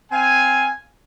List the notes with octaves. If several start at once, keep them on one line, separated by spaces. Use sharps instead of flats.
C4 F5 G#5